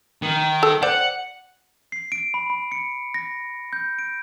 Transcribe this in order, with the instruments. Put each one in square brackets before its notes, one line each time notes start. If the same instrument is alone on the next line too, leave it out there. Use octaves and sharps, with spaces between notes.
[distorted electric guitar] D#3
[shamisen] A4
[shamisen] C5 D5 G5 [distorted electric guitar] F#5
[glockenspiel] C7
D7
B5
B5
C#7
A#6
G6
D7